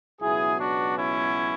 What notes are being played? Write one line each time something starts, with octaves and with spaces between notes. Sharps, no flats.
C#2 B2 F#3 B3 E4 G#4
D4 F#4
C#4 E4